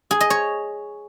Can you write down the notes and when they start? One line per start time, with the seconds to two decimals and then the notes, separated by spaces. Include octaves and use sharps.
0.11 G#4
0.21 D#5
0.30 C#5